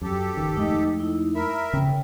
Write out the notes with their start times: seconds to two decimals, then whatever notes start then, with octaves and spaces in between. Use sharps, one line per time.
0.02 F#2 G4 A4
0.37 G1 D#3
0.56 F2 G#3 A3 D#4 D#5
0.99 D#4 E4
1.35 A#4 E5 B5
1.73 C#3 C#4 G5